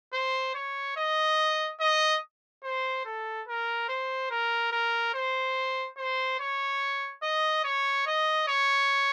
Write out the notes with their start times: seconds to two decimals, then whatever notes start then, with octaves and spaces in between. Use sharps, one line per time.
0.13 C5
0.55 C#5
0.97 D#5
1.80 D#5
2.64 C5
3.05 A4
3.48 A#4
3.89 C5
4.30 A#4
4.72 A#4
5.14 C5
5.98 C5
6.40 C#5
7.23 D#5
7.64 C#5
8.06 D#5
8.48 C#5